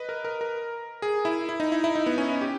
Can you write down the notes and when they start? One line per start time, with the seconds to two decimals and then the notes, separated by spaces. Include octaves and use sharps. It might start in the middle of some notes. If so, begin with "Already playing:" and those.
Already playing: B4 D#5
0.09 A#4
0.25 A#4
0.41 A#4
1.02 G#4
1.25 E4
1.49 E4
1.60 D#4
1.72 E4
1.84 E4
1.95 D#4
2.06 B3
2.18 C#4
2.30 E4
2.41 G4